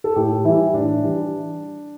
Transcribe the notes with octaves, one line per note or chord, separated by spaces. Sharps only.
A4
A2 G4
E3 G3 E4
A2 D4
E3 G3